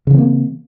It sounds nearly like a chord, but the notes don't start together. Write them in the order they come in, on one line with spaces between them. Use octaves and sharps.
C#3 E3 C4 A#3